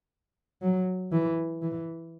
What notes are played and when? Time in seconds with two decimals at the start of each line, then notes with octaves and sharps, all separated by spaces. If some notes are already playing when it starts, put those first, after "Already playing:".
0.62 F#3
1.12 E3
1.62 E3